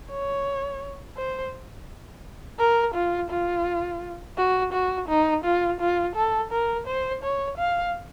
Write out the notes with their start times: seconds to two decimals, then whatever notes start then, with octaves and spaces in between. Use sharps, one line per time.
0.10 C#5
1.17 C5
2.59 A#4
2.94 F4
3.30 F4
4.37 F#4
4.73 F#4
5.08 D#4
5.44 F4
5.80 F4
6.15 A4
6.51 A#4
6.87 C5
7.23 C#5
7.57 F5